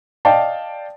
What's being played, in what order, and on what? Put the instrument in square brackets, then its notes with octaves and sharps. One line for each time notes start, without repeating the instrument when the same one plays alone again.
[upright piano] D5 D#5 F5 G5 A5